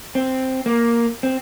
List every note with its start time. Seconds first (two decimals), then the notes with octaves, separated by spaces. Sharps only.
0.15 C4
0.66 A#3
1.23 C4